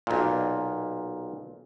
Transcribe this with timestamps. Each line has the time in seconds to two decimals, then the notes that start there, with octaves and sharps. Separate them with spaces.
0.07 B1 A#2